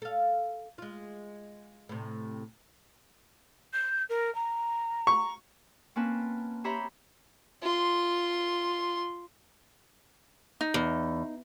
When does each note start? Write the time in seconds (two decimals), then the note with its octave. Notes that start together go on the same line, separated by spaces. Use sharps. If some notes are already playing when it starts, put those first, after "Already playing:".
0.02 A4 F5
0.78 G#3 F4
1.89 A2 C3
3.73 G6
4.09 A#4
4.35 A#5
5.07 C#6
5.96 A#3 C4 C#4 B4 A5
6.64 G4 C5 C#5 E5 A#5 B5
7.62 F4 C6
10.61 D#4
10.74 E2